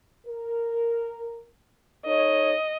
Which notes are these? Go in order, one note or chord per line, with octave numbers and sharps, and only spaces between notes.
A#4
D#4 A4 C#5 D#5